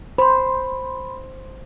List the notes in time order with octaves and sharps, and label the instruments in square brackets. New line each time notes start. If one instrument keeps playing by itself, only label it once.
[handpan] C5 [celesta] B5 C6